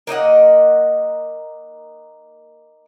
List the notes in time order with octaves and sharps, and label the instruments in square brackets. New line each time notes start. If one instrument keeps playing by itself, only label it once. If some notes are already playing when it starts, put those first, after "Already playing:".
[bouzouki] A#3 D#4 D#5 F#5